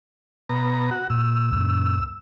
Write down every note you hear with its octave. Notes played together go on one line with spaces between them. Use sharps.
B2 A#5
F#4
A#2 E6
C#2 F#2 A#2